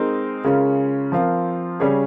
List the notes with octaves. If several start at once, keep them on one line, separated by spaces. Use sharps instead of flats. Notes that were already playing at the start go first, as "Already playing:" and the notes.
Already playing: G#3 C4 D#4 A#4
C#3 G#3 C#4 F4 A#4
F3 C4 F4 A#4
C#3 G3 C#4 G#4